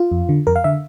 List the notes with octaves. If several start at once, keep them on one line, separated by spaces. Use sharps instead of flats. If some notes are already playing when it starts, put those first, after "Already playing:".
Already playing: F4
F2
D3
F2 A#4
F5
D3 E5